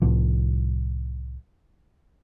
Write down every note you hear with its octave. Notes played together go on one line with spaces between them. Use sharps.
C2 A2 F3